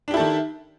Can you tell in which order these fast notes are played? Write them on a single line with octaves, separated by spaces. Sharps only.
D4 G4 E4 A4 D#3